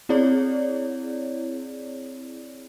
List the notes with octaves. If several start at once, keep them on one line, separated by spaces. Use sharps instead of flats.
C4 E4 G#4 C#5 D5